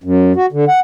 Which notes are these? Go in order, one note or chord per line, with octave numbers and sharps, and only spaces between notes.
F#2
F#4
D3
F#5